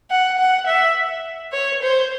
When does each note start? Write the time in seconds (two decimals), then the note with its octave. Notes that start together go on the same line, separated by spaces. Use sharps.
0.11 F#5
0.39 F#5
0.67 E5
1.53 C#5
1.82 C5